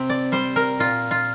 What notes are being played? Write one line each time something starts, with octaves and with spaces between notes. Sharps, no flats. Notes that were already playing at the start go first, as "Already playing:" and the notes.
Already playing: C3 C4
D5
G3 C5
A#4
A#2 F4
F4